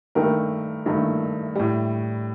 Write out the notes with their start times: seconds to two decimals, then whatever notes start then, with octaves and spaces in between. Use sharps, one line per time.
0.15 G2 D#3 A3 G4 A#4
0.86 G2 D#3 A3
1.55 A2 G3